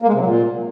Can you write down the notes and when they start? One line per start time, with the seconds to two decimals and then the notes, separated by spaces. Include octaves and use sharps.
0.02 A#3
0.08 G#3
0.14 C3
0.20 F#3
0.26 A#2